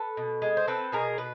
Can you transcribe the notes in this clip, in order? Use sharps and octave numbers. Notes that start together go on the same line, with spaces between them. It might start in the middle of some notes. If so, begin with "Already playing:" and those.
Already playing: A4 B4
B2
G#3
C5
C4 A4 B4
B2 G#4 A#4
B2 B4